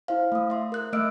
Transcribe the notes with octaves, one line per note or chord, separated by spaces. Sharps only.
E4 C5 F5
A3 D#6
E5 C6
A#4 F#6
A3 D#5 E5 E6 F6 D7